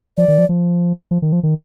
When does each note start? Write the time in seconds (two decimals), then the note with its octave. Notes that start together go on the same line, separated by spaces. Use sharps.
0.17 F3 D5
0.28 D#3
0.38 F3
0.49 F3
1.11 F3
1.22 D#3
1.32 F3
1.43 D#3